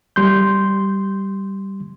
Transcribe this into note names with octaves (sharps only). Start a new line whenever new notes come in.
G3 C6 G6